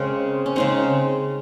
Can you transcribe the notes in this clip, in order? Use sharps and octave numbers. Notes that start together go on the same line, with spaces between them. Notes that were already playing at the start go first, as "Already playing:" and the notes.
Already playing: C#3 G#3 C4 A#4
C#4
C#3 G#3 C4 D#4